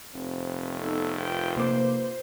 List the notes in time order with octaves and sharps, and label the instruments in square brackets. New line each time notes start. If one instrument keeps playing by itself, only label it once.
[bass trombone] F1 [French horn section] C4
[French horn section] B3 D#4 [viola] A4
[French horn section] F4 A#4 B4 [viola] G5
[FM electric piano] C3 A#3 D6 [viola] C5